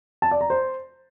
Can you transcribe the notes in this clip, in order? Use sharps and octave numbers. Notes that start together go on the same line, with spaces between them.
A5
D5
A#5
C5